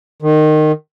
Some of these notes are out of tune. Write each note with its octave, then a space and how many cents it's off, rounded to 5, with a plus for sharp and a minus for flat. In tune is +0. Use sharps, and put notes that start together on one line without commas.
D#3 -20